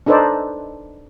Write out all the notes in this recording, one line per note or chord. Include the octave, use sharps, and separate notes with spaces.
D4 D#4 A4 B4 C5 D5